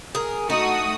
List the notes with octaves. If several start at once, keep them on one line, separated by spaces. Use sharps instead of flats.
G#4 A#4
A3 D#4 F#4 D#6